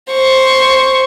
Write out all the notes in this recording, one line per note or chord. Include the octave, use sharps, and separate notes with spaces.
C5 C#6